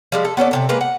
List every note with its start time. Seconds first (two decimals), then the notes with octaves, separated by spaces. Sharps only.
0.12 F3 G3 G#3
0.25 A4
0.37 B3 C#4 A4 D5
0.51 C3 D#3 A4
0.69 G#3 A#3 B4
0.81 F#5